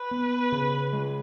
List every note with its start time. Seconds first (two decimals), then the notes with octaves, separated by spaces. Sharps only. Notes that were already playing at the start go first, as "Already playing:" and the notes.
Already playing: B4
0.11 B3
0.52 C#3
0.93 G#3